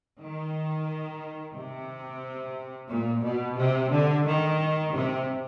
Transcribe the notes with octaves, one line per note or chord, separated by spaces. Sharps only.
D#3
C3
A#2
B2
C3
D3
D#3
C3